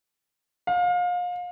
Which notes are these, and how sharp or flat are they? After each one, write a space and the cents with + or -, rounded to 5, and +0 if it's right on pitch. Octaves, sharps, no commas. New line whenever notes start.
F5 +30